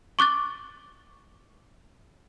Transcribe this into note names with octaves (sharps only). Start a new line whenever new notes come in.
C#6 D6 F#6 A6